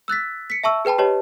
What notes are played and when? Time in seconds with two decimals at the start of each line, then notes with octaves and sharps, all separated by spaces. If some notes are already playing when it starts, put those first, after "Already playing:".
0.08 E6 F#6 A6 B6
0.50 B6 C#7
0.64 E5 A5 C#6 E6
0.85 G#4 B4 G5 A5 B5
0.98 G4 B4 C#5 D#5 A5